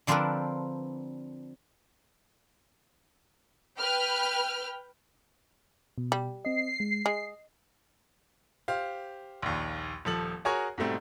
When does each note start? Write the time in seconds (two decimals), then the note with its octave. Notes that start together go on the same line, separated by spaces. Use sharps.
0.07 D3 F3 C4 D4 A#4 B4
3.79 B4 G5 F6
5.98 B2
6.12 G3
6.45 C4 D#5 C7
6.80 G#3
7.06 G#3 D#5
8.68 G4 C5 F5
9.42 A#1 D#2
10.05 D#1 F3 A4 F#7
10.45 F#4 G#4 A#4 C#5 G#5 C#6
10.78 G#2 B2 G3 A3 C4